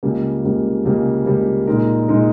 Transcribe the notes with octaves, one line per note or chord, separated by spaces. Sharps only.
C#2 C#3 G3 A#3
C#2 C#3 G3 A#3
C#2 C#3 G3 A#3
C#2 C#3 G3 A#3
A#2 G#3 D#4 A#4
A#2 G#3 D#4 A#4